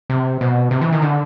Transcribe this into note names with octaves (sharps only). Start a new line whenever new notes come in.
C3
B2
C3
E3
D#3
D3